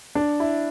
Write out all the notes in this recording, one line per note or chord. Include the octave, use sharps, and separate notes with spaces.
D4
E4